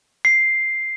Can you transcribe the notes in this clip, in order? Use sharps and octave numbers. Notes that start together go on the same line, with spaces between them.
C7